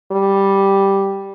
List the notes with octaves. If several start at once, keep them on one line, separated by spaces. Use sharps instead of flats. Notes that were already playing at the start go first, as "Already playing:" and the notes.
G3